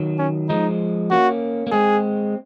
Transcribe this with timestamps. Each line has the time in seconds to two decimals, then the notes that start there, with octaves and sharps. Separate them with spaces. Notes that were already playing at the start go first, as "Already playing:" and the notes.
Already playing: D#3 F#3
0.19 C#4
0.49 F3 G#3 D#4
1.11 A#3 C#4 F#4
1.67 A#3
1.72 G#3 C4 G#4